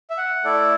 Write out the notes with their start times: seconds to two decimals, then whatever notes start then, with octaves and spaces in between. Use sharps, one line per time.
0.10 E5
0.18 F#5
0.44 A3 E4 A4 D5